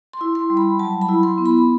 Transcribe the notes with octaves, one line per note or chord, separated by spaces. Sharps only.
C6
E4
C6
G3
B5
F#3 A5
B5
E4
C6
B3
B5